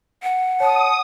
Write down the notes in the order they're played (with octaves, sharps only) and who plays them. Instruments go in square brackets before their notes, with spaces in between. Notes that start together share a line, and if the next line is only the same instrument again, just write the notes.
[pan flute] F#5
[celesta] C#5 [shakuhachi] A5 [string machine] D#6